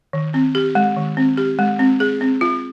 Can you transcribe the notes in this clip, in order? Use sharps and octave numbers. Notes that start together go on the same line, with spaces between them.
D#3
C4
G4
G#3
D#3
C4
G4
G#3
C4
G#4
C4
F4